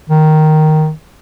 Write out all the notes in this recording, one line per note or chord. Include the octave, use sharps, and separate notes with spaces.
D#3